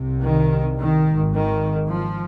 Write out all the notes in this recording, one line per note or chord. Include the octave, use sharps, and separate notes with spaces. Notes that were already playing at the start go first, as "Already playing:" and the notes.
Already playing: C2 C3
D#3
D#3
G#1 G#2
D#3
F3